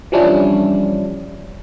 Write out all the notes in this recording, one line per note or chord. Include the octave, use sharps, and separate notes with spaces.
E3 F3 G3 C#4 D4 E4